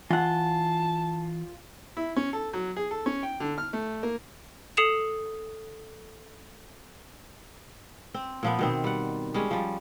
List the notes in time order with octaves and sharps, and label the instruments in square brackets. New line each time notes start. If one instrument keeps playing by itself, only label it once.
[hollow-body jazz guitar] E3 F#5 [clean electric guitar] F4 [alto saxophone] A5
[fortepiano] E4
C#4
A4
F#3
G#4
A4
C#4
G5
D3
F6
A3
A#3
[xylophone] A4 D#6 C7 C#7 E7 F7
[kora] C4
A#2 F3 B3
B2 D#3 C4
G3 F#5
G3 G#3 C#4
F3 G3